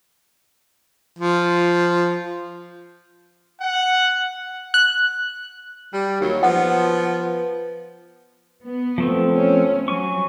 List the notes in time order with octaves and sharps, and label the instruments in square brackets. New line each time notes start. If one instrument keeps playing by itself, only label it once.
[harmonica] F3
[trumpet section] F#5
[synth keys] F#6
[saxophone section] G3
D#2 F#3
[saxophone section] F3 B3 [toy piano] F#5
[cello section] B3
[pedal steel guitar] F3 A3 C4
[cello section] C#4
[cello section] F#3 [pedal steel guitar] G#5 C#6